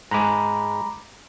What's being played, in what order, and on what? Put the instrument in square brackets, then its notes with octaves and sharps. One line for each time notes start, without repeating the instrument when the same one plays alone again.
[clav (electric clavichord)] G#2 G#3 [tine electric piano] A#5 B5 D6